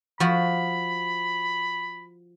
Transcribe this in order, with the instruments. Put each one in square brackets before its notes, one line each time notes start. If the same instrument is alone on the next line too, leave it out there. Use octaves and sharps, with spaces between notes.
[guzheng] F3 F#4 [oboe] B5